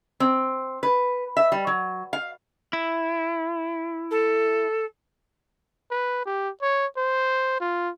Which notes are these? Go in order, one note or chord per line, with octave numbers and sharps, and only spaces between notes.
C4
B4
E5
G3
F#3
F5
E4
A4
B4
G4
C#5
C5
F4